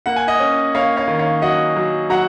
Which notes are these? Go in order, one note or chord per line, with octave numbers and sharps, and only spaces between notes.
A#3 F#5
G#5
D#5 F#5
C#4
A#3 C#5 F5
C#5 F5
D#3
C#5 F5
F#3 D#5 F#5
F#3
F#3 F#5 A#5